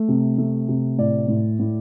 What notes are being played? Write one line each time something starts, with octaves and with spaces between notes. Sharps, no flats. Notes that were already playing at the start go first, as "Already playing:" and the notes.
Already playing: A3
C3
A3
C3
A2 D5
A2
A2